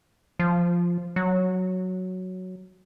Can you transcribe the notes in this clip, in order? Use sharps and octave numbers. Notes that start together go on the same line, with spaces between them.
F3
F#3